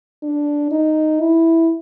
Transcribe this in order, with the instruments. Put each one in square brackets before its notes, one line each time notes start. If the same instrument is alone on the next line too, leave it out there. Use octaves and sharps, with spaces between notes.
[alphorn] D4
D#4
E4